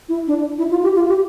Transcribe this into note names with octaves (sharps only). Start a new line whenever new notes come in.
E4
D4
E4
F4
G4
F4
G4